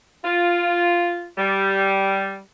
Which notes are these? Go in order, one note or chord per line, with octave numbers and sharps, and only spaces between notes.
F4
G3